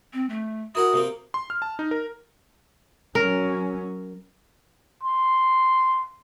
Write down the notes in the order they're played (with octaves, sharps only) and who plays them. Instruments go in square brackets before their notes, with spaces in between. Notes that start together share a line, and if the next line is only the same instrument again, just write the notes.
[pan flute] C4
A3
[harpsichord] E4 A#4 F#5 [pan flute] F#4 [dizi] D#6
[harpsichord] C3 A#3 C4
[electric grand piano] C6
F6
A5
D#4
A#4
[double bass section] F#3 C#4 [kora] A#4
[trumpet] C6